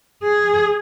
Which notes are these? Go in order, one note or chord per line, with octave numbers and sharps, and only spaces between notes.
G#4